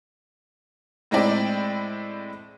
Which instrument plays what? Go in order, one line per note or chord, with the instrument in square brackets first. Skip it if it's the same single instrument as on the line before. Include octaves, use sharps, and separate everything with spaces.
[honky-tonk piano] A2 G#3 C4 E4 D5 G5